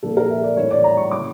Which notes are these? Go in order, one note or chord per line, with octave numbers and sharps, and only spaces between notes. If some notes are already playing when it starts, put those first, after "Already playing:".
A#2 F3 A#3 A4
A#4
E5
D5
A2 E3 A3 C#5
D5
A#5
C#6
C#3 E3 A#3 D6